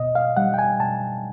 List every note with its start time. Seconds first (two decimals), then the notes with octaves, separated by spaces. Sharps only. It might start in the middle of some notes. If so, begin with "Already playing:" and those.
Already playing: B2 D#5
0.15 F5
0.37 G3 F#5
0.54 G5
0.59 G#5
0.80 B2 A5